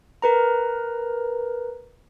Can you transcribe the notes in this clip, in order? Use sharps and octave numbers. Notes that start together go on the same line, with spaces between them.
A#4 B4 A#5